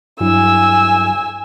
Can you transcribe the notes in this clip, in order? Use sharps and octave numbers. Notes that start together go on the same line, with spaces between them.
G2 F#3 E4 G#5 E6